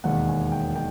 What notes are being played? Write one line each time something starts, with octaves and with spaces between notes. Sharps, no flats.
E1 D#2 D#3 F#5
G#5
G5
D#3 G5